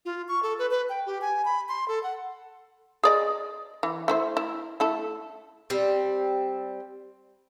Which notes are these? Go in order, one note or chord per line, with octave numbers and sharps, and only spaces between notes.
F4
C#6
A4
B4
B4
G5
G4
G#5
B5
C6
A4
F#5
G#4 D5 D#5
E3
A3 E4 C5
E4
A3 E4 A4
G3 C4